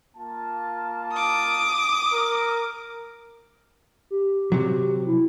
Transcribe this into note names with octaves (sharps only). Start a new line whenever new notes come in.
A#3 F4 A5
D6 D#6
A#4
G4
C3 F#3
E4